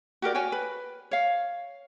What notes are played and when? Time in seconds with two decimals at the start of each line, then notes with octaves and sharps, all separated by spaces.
0.22 F#4 G4 A#4 D5
0.35 F#4 C#5 G5 G#5
0.52 B4
1.11 C#5 F5